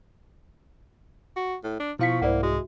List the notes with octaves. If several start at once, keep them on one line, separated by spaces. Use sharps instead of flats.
F#4
A2
D4
B2 F3 E4 F5 C#6 B6
C2 G#2 A#3 E4 C5 D5 F#5
G#3 F#4